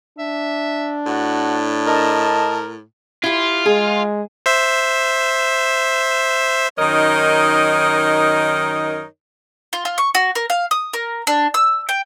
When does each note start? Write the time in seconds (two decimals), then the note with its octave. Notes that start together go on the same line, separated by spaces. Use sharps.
0.18 D4 E5
1.06 A2 F#4
1.86 A#4 D#5 A5
3.24 E4 F4 G4
3.66 G#3 G#4
4.46 C5 E5
6.78 F#2 D#3 D#4 A#4 C#5 D#5
9.73 F4
9.85 F4
9.98 C#6
10.15 F#4
10.35 A#4
10.50 F5
10.71 D#6
10.93 A#4
11.27 D4
11.54 E6
11.89 G5